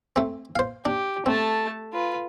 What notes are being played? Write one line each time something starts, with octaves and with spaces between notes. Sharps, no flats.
A3 C4
C5 F5
D4 G4
A3 C4 A5
F4 B4